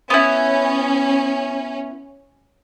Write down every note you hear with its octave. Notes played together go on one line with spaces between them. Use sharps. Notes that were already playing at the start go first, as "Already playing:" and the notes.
B3 C#4 E4